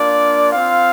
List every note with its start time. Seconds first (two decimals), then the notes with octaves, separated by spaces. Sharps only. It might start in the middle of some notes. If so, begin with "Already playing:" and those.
Already playing: A#3 D4 F4 D5
0.53 C4 F4 F5